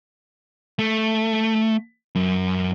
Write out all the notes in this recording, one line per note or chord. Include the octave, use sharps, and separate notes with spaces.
A3
F#2